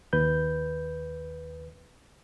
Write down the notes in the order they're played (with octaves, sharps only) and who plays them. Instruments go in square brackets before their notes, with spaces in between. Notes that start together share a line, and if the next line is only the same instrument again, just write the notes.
[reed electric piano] D#2 B4 G6